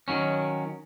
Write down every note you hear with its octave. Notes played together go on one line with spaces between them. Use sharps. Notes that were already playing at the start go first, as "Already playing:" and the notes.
D#3 F#3 C#4